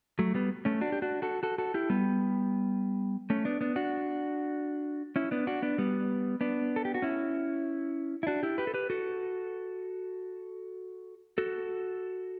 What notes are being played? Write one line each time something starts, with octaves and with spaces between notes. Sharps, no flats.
F#3 A3
G3 B3
A3 C#4
D4 F#4
G4
D4 F#4
F#4 A4
F#4 A4
F#4 A4
E4 G4
G3 B3
A3 C#4
B3 D4
B3 D4
D4 F#4
C#4 E4
B3 D4
D4 F#4
B3 D4
G3 B3
B3 D4
A4
G4
F#4
C#4 E4
E4
D4 F#4
E4 G4
G4 B4
A4
G4 B4
F#4 A4
F#4 A4